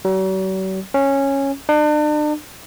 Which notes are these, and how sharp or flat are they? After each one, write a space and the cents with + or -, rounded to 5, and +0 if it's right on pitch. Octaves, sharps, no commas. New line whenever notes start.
F#3 +45
C#4 -10
D4 +40